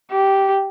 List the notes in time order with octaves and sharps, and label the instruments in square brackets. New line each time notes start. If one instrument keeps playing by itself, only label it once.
[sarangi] G4